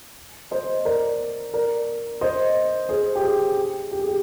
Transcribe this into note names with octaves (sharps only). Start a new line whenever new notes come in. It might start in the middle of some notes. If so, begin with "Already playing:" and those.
C5 D#5
A#4 D5
A#4 D5
C5 D#5
G#4 C5
G4
G#4
G4
G#4
G4